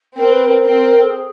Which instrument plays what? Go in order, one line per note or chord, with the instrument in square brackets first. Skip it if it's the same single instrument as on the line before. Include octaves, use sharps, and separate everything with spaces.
[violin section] C4 [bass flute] A#4
[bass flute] B4
A#4
[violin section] C4
[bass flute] A4
G#4